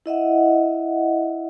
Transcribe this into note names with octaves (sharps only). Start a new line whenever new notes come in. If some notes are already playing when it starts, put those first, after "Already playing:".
E4 D#5 E5 F#5